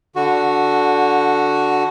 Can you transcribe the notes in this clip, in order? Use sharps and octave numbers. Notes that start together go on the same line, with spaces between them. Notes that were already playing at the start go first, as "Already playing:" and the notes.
D3 F#4